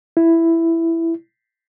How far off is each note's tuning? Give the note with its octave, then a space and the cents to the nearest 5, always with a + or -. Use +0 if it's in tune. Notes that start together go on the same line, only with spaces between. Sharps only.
E4 +5